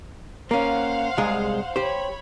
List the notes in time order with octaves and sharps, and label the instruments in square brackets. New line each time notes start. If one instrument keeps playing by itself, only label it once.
[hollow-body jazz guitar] A#3 C#4 [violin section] C5 F5 F#5
[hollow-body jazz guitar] C2 G#3 G#4
[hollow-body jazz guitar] G4 C5 [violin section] C#5 B5